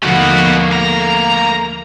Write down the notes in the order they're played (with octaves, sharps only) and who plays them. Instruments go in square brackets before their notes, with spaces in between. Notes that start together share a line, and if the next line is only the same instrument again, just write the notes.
[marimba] D#2 D3 F3 [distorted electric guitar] B2 F#4 [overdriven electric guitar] A3 A#3
[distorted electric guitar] A#5